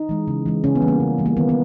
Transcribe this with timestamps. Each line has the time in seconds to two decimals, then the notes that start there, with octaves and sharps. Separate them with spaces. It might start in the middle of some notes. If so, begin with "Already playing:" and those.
Already playing: D#4
0.09 E3 G#3
0.28 C#3
0.46 E3 G#3
0.64 C#3 C#4
0.75 B3
0.82 E3 G3
0.88 A#3
1.00 C#3
1.18 E3 G3
1.26 A#3
1.37 D#3 B3
1.49 B3